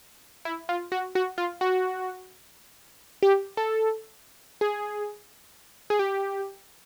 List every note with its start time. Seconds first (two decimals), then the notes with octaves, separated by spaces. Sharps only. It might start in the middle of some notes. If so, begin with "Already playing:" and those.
0.45 E4
0.69 F4
0.92 F#4
1.15 F#4
1.38 F4
1.61 F#4
3.23 G4
3.57 A4
4.61 G#4
5.90 G#4
5.99 G4